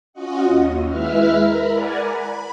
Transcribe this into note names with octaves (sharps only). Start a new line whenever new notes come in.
C#4 F4 F#4 D#5 F#5
D#2
G#3 E4 B4 E5 F6
A#4 B5
D5 F#5 G#5 A#5
B5